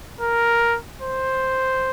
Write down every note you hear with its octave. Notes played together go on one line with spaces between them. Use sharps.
A#4
C5